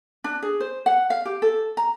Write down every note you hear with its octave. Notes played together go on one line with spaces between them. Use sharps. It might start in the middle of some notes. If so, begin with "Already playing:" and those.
D4
G#4
C5
F#5
F5
G4
A4
A#5